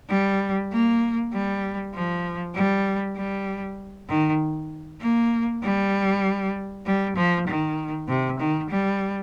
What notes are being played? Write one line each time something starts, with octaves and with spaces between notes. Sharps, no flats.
G3
A#3
G3
F3
G3
G3
D#3
A#3
G3
G3
F3
D#3
C3
D#3
G3